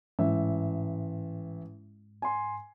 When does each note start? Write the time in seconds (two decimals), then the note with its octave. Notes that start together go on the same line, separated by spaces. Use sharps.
0.19 A1 G#2 E5
2.22 G#5 C6